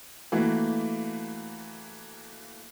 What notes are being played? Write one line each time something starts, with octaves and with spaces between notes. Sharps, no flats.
E3 A3 A#3 F#4